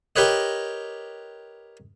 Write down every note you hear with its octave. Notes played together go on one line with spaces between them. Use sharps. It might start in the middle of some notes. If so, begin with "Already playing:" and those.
G4 A#4 B4 C#5 D#5